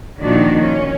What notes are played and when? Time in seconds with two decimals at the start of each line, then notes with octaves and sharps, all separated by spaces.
0.20 A#2 D#3 F3 D4 F#4
0.61 C#4